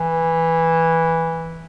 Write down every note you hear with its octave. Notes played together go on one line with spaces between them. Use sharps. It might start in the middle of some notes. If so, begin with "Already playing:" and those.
Already playing: E3